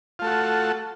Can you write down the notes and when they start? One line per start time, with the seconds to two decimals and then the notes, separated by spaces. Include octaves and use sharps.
0.19 F4
0.22 A3
0.24 A4
0.27 F#4